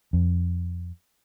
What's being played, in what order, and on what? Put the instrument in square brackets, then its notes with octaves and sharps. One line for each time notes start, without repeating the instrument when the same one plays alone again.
[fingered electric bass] F2